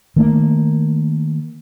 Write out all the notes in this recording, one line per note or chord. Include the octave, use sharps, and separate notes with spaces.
D#3 A3 A#3